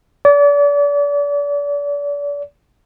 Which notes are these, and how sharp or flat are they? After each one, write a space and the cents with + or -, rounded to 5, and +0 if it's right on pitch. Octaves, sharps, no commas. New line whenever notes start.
D5 -35